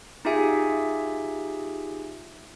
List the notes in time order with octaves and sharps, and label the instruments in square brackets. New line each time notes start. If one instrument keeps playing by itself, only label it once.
[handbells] D#4 F4 G4 G#4 E5 G#5